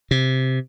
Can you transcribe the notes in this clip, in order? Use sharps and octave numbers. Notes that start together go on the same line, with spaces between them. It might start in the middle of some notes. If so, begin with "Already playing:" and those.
C3